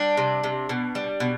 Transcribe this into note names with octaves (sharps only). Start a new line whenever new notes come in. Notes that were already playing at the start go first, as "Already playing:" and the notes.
Already playing: G3 D4
C3
C3
B2
G3
B2